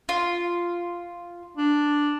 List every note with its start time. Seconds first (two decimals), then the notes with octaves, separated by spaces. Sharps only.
0.09 F4
1.57 D4